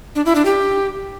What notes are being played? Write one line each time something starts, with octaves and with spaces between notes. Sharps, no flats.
D4
E4
D4
G4